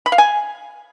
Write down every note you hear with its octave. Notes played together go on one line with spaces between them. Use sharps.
B5
F5
G#5